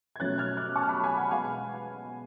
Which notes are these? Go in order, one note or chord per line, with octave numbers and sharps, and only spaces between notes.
G#6
B2 F#3 A3 C#4 F#6 A6
F6 G#6
D6 F#6
A5 C#6
F6
B5 D6
G#5 B5
F#5 A5
B2 G#3 B3 F5 G#5